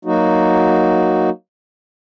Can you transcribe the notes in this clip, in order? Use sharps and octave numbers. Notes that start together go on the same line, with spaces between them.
F#3 A#3 D#4 F#4